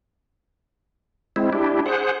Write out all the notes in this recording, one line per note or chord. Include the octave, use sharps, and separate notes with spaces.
G#3 C4 E4
D4 E4 G4
G#4 C5 F#5